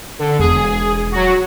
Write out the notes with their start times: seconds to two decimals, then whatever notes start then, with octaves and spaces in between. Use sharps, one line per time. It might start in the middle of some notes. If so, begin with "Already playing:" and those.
0.19 D3
0.39 E1 G#4
1.12 F#3 F#4